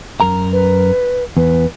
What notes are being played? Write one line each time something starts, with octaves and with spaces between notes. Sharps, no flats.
F#2 A#4 A#5
B4
E2 B4